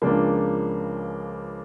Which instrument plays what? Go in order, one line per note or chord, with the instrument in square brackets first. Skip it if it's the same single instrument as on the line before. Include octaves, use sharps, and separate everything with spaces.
[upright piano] C#2 C#3 F3 A#3 D4